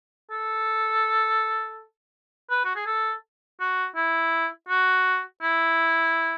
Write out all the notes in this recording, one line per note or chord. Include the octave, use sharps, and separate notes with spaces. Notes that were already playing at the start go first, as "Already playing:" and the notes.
A4
B4
F#4
G#4
A4
F#4
E4
F#4
E4